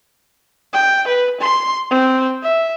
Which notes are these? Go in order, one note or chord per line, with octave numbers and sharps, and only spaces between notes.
G5
B4
C6
C4
E5